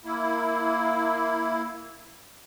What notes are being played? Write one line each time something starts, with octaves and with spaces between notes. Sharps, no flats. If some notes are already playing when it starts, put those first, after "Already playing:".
A#3 E4